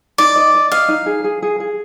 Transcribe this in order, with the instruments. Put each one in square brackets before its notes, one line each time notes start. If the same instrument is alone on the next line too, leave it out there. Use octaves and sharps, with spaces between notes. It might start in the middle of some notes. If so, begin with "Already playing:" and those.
[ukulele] D#4 [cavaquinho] D5
[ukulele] D#5
D#5
[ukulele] D#5 [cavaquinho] F5
[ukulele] D#4
G#4
G#4
G#4
G#4